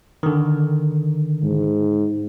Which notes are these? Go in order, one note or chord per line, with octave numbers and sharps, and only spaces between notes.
D3 D#3
G#2